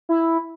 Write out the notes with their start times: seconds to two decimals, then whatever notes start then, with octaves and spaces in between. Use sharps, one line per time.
0.09 E4